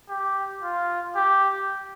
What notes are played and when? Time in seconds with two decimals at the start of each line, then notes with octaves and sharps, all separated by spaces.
0.09 G4
0.63 F4
1.16 G4